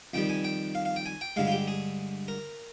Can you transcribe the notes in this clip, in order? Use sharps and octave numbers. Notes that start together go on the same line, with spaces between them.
F2 D#3 G3 G5
G#5
G5
F5
F5
G5
G#5
G5
G2 D3 G#3 F5
F4
G4
G#4
A#4